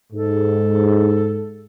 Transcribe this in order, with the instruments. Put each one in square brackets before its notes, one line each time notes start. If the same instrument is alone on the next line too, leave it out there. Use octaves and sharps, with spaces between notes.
[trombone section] G#2 [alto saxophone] A4